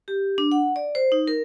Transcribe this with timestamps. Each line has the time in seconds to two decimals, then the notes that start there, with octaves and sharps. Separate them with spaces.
0.08 G4
0.38 D4
0.51 F#5
0.76 D5
0.95 C5
1.12 D#4
1.27 A#4